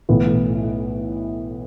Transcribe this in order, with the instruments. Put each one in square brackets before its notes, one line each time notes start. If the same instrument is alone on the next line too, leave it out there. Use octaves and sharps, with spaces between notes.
[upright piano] B1 A2 E3 B3